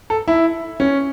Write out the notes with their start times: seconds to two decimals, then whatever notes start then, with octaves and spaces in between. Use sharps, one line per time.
0.10 A4
0.28 E4
0.80 C#4